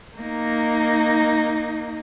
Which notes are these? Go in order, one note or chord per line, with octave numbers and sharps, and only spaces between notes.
A#3 D#4